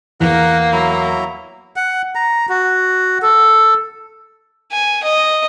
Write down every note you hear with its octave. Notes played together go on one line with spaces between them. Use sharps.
E2 A#3 A#4 F#5
F#3 E4 A#5
F#5
A#5
F#4
A4
G#5
D#5